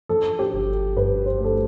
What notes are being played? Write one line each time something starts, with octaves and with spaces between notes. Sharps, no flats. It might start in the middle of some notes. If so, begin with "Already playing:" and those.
F3 A4
G4
G1
G2 B4
C5
A3 A4